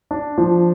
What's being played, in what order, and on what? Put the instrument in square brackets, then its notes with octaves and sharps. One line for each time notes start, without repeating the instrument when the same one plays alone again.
[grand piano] D4
F3